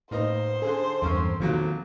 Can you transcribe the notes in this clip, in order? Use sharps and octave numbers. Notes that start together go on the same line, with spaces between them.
A2 A#3 D#4 B4 C5 D#5 D#6
D3 G#4 A4
E2 G2 C4 C#4 A#4
B1 A#2 D#3 F3 F#3 C4